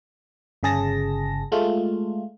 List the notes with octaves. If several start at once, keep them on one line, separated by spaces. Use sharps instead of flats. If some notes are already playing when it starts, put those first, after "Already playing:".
G1 C#3 G#4 A5 A#6
G#3 A3 F4